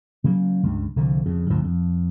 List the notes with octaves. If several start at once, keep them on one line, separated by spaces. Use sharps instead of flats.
C#3 F#3 A#3
C#2 G2
C2 D3 D#3 F3
F2 C#3
D2 G2 A#2 F3
F2